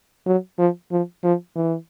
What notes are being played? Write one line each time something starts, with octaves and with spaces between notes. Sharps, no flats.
F#3
F3
F3
F3
E3